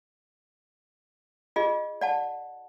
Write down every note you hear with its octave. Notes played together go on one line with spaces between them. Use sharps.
F4 G#4 D#5
D5 F#5 A5